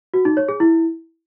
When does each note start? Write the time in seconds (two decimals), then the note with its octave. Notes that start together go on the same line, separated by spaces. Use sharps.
0.14 F#4
0.25 D#4
0.37 C#5
0.49 G#4
0.60 E4